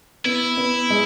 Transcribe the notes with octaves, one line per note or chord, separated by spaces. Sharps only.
B3 E4
B3
G#3